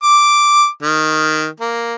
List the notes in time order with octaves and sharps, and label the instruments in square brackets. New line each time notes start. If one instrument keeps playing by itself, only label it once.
[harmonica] D6
D#3
A#3